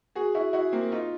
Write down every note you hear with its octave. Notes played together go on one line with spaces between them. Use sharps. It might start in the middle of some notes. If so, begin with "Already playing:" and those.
F#4 G#4
E4 F#4
E4 F#4
A#3 C4
D#4 F4